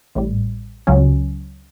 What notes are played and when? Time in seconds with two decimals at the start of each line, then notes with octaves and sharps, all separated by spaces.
0.15 A1 A2 G3
0.87 C#2 C#3 F#3 C#4